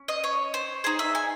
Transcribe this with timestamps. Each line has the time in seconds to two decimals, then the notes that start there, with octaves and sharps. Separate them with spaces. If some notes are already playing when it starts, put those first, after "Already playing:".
Already playing: C#4
0.08 D#5
0.24 C#5
0.54 C5
0.84 D#4 G#4 C5
0.99 E5
1.15 G#5